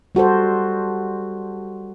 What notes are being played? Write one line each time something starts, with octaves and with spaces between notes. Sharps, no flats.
G3 F#4 A4 C5